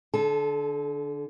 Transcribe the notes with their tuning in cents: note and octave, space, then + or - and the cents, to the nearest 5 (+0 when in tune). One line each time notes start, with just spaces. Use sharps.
D3 +0 A4 -35 A5 +0